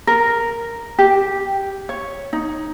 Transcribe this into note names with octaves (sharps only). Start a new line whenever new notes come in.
A#4
G4
C#5
D#4